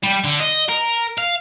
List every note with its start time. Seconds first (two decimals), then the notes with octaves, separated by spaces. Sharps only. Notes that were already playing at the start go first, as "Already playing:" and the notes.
0.03 G3
0.24 D3
0.40 D#5
0.69 A#4
1.18 F5